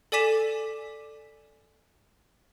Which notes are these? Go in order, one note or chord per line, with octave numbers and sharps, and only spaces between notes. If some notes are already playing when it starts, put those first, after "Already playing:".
A4 D5 G#5 D6 B6 E7